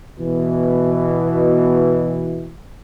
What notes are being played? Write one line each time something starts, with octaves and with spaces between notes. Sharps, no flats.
B2 E3